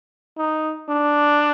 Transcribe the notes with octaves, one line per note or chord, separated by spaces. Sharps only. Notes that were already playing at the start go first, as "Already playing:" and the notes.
D#4
D4